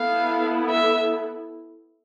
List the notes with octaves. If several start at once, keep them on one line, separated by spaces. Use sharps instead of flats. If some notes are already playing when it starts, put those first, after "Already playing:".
Already playing: B3 E4 A4 F5
E5